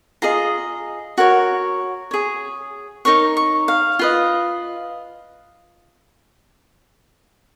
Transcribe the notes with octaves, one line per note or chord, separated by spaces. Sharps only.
F4 G#4 D#5 A#5
F#4 A#4 C#5
G#4 C#5
D#4 A#4 C#5 C#6
C#6
F5
F4 B4 D#5